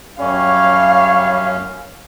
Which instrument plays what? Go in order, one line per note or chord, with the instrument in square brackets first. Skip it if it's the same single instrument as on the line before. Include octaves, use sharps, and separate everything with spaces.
[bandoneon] F#2 C#4 [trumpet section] G3 C#5 [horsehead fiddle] F5